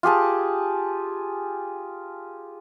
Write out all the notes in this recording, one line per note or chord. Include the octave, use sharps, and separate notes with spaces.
F4 G4 G#4 A5